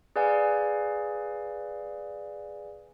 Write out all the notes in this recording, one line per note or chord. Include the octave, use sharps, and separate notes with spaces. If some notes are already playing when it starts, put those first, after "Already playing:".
G#4 B4 D5 F5 G#5